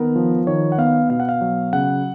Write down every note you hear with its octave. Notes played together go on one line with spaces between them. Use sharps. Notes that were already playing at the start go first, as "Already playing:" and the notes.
Already playing: D#3 B3 A#4
F3
D#3 C#5
F#5
B3 F5
B2 F5
F#5
F5
F#3
C#3 F#5